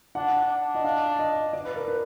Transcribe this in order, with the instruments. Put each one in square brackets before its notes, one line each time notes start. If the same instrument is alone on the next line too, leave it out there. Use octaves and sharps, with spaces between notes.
[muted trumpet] D4 [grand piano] F#5
[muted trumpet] D4
[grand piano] D#5
F5
D#5
D5
B4
A#4
B4